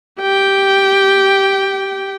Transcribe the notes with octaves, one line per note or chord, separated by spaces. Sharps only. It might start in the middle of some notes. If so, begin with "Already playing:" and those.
G4 G5